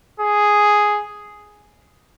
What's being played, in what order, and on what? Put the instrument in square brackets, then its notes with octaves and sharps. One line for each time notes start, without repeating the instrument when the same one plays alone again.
[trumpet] G#4